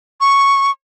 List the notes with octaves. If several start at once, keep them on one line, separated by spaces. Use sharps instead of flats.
C#6